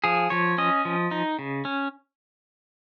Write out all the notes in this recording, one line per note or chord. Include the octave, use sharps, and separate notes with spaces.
F3 G#4
F3 C#5
C#4 D#5
F3
D#4
C#3
C#4